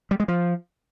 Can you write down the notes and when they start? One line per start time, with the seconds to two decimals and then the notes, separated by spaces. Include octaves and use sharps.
0.11 G3
0.20 G#3
0.28 F3